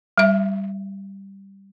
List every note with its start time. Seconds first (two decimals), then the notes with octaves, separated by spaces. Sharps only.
0.18 G3 E5